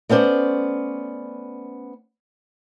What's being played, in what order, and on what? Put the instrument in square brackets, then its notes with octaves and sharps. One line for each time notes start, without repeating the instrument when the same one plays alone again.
[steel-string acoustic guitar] A3 B3 C#4 C5 D5